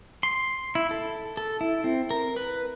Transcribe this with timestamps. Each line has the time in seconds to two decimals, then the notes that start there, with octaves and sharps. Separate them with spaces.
0.23 C6
0.75 E4
0.91 A4
1.37 A4
1.61 E4
1.84 C4
2.11 A#4
2.36 B4